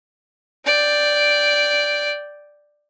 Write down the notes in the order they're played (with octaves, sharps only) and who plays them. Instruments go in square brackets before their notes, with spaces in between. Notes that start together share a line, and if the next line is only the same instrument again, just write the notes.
[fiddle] D5 G5